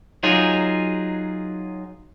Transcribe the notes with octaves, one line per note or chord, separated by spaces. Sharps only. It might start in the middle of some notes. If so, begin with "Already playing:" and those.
F#3 D#4 F4 G#4